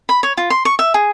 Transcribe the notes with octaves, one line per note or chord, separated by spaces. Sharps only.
B5
C#5
F4
C6
C#6
E5
G#4